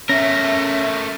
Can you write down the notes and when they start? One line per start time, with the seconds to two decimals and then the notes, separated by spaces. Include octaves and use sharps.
0.09 A3 C#4 A#4 E5 A#6